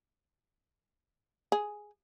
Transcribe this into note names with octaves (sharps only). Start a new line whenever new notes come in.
G#4